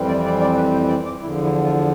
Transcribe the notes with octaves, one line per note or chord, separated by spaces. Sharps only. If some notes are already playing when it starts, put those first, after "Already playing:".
Already playing: F2 E3 G3 C4
D5
D5
D5
B4
C5
D5
D5
E2 D3 F3 E4
E4
F4